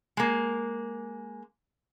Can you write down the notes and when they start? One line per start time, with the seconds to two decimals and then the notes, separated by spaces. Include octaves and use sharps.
0.17 G#3 A#3